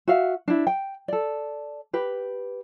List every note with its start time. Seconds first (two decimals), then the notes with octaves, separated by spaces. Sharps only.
0.08 F#4 E5 F5
0.48 D4 E4
0.67 G5
1.08 A4 D5
1.93 G4 B4